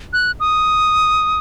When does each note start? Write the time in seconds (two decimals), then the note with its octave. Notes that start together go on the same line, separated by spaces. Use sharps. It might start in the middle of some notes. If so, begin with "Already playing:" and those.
0.13 F#6
0.40 D#6